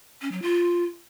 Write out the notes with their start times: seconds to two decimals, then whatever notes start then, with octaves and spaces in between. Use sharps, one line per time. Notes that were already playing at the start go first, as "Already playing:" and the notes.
0.22 C#4
0.32 F#3
0.42 F4